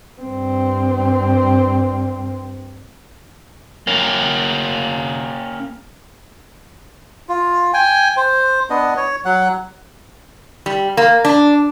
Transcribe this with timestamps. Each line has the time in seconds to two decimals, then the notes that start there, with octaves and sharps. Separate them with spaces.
0.22 G2 C4
3.87 A#3 C#4
7.29 F4
7.74 G5 G#5
8.17 C5
8.70 B3 D4 D#5
8.97 C#5
9.25 F#3 F#5
10.66 G3
10.97 A#3
11.25 D4